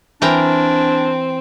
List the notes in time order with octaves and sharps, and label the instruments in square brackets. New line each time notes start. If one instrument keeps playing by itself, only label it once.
[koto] E3 A#4 G5 [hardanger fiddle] C4 [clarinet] D4